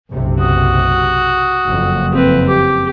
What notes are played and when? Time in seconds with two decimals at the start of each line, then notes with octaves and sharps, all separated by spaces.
0.11 F#1 B1 C3
0.40 F#4 D#6
1.65 F#1 F2
2.13 C4 B4
2.48 G4 D6